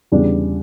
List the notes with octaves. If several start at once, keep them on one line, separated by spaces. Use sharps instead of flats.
E2 C#3 G3 D4